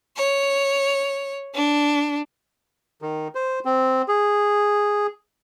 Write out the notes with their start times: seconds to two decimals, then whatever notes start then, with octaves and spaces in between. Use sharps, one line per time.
0.16 C#5
1.55 D4
3.02 D#3
3.35 C5
3.65 C4
4.08 G#4